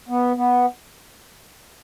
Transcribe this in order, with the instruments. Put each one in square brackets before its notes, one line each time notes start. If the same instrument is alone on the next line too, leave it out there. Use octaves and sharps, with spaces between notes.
[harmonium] B3
B3